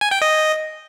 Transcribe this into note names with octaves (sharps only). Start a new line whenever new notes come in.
G#5
G5
D#5